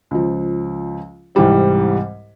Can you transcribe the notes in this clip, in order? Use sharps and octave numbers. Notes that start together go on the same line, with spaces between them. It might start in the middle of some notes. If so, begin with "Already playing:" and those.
C#2 F3
C2 G#2 E3 G3 C4